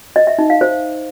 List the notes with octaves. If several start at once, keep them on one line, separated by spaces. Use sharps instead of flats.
D#5
E5
D#4
F5
C5